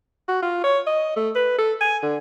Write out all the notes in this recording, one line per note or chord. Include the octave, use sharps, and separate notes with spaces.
F#4
F4
C#5
D#5
A3
B4
A4
G#5
D3